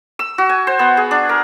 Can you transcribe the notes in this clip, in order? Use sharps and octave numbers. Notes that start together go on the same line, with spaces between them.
E6
F#4
G#5
C5
B3
G#4
D4
A#4